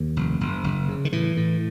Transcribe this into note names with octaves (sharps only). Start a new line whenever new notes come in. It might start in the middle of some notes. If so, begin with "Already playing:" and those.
Already playing: D#2
F1
F#1
F#1
C#3
D#3
A2 E3
A2